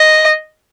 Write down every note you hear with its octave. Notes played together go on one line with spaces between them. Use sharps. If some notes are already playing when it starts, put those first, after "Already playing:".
Already playing: D#5